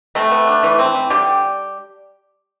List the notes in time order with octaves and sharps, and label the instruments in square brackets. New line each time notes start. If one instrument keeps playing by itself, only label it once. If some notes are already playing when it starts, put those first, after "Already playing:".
[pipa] C3 A3 A4
B3
D4
E3
C4
E3
D3 G3 G4